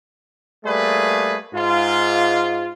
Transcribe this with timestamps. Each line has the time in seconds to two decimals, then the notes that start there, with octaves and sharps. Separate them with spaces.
0.65 G3 A3 A#3 G#4 B4
1.54 G#2 F4